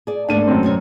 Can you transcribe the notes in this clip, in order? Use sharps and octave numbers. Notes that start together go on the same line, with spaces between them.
G#4 D5
G#2 A3 A#3 D4 D#7
F#2 C4
D2 B2 C#5